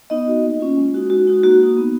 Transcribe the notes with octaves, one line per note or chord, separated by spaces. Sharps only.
B3 D#4 D#5
F#4
A#3
C#4 F4
G#3
D#4 F#4
G#3 F#4
D#4 F#4
A#3 F#4
D#4 F#4
B3